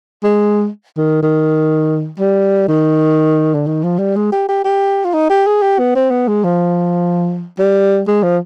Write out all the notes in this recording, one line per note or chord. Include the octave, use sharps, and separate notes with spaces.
G#3
D#3
D#3
G3
D#3
D3
D#3
F3
G3
G#3
G4
G4
G4
F4
D#4
G4
G#4
G4
B3
C4
B3
G#3
F3
G3
G#3
F3